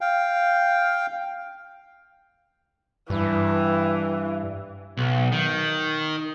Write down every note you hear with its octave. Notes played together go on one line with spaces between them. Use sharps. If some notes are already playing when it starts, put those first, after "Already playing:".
F5 G5
G2 E3
B1
D#3